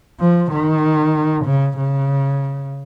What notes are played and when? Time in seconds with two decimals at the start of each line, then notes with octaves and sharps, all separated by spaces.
0.20 F3
0.51 D#3
1.45 C#3
1.77 C#3